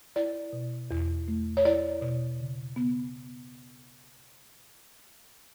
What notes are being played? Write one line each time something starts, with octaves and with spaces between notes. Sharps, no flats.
E4 D5
B2
E2
A3
C#5
E4 D5
B2
C#3
B3